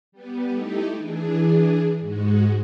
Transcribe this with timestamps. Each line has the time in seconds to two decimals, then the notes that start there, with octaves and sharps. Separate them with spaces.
0.12 G3 B3
0.51 A3 D#4 E4 G4
0.96 E3 D4 G#4
1.99 G#2 G#3 F#4